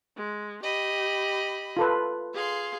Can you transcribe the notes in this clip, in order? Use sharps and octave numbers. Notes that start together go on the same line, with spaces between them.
G#3
G4 D#5 B5
F4 A4 B4
G#4 F5 C6